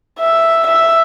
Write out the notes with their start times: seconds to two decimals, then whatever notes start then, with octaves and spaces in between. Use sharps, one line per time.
0.19 E5
0.66 E5